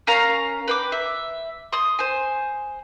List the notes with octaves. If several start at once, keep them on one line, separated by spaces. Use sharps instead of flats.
C#4 A#4 F5 A#5
B4 G5 D6
E5
C6 D#6
C5 G#5